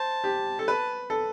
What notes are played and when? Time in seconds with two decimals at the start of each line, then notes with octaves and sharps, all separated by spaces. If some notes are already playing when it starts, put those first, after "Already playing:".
Already playing: C5 A5
0.24 G4
0.59 A4
0.68 B4
1.10 A4